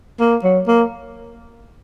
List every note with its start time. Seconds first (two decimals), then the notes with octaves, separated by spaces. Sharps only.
0.20 A#3
0.43 F#3
0.67 A#3